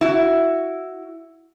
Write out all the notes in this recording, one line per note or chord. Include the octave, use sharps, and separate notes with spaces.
E4 F#4